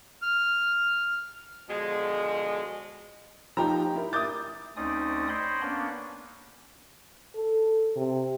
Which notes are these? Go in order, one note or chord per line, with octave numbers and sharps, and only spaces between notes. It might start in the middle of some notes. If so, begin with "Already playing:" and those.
F6
B2 D3 F3 G#3
F3 D#4 G4 A#5
E4 A#4
E5 D6 D#6 G6 A6
D2 C4 C#4 D#4 D5 D#6
C5 C#5 D#5 G5 B5 C6
A#3 B3 C#4 D4
A4
C3